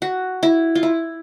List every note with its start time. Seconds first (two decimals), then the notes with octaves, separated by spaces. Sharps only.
0.02 F#4
0.43 E4
0.75 F4
0.83 E4